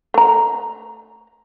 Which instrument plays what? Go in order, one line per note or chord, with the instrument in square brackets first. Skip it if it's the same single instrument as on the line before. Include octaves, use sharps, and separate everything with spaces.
[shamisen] A3 A#5